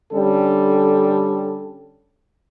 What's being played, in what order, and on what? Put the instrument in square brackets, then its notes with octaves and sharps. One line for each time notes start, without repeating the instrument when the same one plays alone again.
[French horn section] D3 G3 C#4 A4